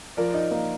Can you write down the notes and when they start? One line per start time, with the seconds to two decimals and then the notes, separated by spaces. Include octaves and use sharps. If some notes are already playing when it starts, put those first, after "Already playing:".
0.17 F3 A#4 D5
0.34 D#4
0.51 A#3